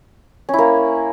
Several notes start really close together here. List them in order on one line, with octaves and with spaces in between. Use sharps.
C#4 E4 A#3